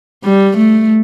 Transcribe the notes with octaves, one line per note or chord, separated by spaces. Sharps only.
G3
A3